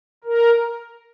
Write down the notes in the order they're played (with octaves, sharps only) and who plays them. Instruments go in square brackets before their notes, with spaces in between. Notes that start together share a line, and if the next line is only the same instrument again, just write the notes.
[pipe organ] A#4